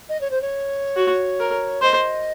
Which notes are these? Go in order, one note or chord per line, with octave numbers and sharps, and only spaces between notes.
D#5
C#5
C5
C#5
F#4
A#4
C5 D#5